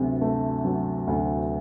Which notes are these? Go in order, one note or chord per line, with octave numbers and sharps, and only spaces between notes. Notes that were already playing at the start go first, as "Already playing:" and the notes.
Already playing: D2 C3 F#3
A3
F#3
D2